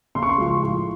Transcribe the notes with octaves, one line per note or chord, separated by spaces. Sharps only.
C#3 C6
C#6
C6
F3 G#3
A2